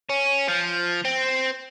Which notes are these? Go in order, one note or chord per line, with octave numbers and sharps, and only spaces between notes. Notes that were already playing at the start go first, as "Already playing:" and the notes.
C#4
F3
C4